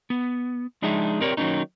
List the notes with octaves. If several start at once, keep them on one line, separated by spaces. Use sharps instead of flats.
B3
F3 G#3 D4 D#4 G#4 E5
C4 G4 A#4 C#5 D5
D#3 F#3 G#3 A#3 C#4 D#4